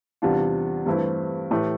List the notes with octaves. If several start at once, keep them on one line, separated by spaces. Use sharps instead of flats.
E2 C3 G3 D4 F4
G2 E3 A3 C4 E4
A2 E3 A3 E4 G4